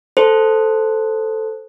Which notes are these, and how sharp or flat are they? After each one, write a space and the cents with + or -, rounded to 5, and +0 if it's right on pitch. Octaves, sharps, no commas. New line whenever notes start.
A4 +0 C5 -5